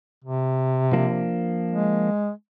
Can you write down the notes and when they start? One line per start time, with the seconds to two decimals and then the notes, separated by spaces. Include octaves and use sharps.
0.24 C3
0.93 F3 A#3 D4
1.71 G#3